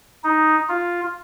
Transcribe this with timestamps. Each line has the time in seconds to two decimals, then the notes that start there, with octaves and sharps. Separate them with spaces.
0.24 D#4
0.69 F4